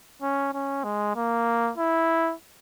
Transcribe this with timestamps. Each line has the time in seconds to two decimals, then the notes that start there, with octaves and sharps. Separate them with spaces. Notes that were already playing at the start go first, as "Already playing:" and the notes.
0.22 C#4
0.54 C#4
0.84 G#3
1.16 A#3
1.78 E4